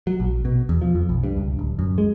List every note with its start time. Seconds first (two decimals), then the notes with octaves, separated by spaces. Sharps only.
0.07 F#3
0.20 A#1
0.45 B2
0.69 E2
0.81 F3
0.95 F2
1.09 B1
1.23 G2
1.37 C#2
1.59 D1
1.79 F#2
1.98 G#3